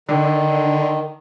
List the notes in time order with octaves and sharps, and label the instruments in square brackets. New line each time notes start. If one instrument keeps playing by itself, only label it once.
[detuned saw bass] D3 [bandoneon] D#3